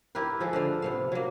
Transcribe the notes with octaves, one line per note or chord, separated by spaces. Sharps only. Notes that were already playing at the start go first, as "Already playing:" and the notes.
E4 G4 A#4 B4
F3 G#3 A4
D3 A3 F5
C3 B3 F5
F#3 A#3